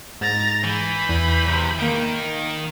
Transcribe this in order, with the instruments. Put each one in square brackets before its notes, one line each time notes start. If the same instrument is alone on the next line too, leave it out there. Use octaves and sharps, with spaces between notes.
[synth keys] G#2 [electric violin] A#5 A6
[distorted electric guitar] E3 [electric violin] B5 G6
[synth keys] E2 D#7
[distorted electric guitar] C3 E3
[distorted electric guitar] D#3 [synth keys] A#3 D7